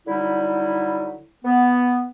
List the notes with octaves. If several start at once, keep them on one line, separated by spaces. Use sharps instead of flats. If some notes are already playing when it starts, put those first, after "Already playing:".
D3 F#3 G3 D#4 E4
B3